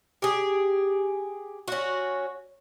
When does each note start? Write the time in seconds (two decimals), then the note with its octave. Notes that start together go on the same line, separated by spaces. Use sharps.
0.22 G4 G#4
1.68 C#4 F#4